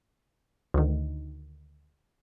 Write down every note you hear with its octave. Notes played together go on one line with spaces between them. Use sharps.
D2 D#3